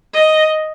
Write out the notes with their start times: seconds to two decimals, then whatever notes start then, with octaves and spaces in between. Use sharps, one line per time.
0.13 D#5